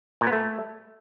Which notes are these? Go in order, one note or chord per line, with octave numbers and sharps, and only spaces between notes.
A#2
B3
A3